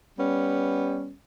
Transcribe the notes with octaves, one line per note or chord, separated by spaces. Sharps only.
G3 B3 C#4